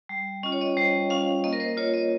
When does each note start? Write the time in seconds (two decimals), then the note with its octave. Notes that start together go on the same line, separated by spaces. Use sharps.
0.09 G3
0.43 C#4 F4 D#5
0.52 C#5
0.61 D#5
0.77 G3 C5
1.10 C#4 F4 F5
1.44 A#3 D#5
1.53 A#4
1.60 C5
1.77 F4 C#5
1.94 D#5